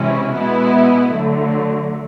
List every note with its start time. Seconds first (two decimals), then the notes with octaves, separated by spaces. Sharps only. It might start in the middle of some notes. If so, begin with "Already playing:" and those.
Already playing: C3 E3 G#3 C#4 E4
0.32 B2 G#3 B3 E4
1.12 D3 F#3 A3